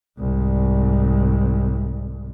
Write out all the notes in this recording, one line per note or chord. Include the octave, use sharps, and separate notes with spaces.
C2 G#2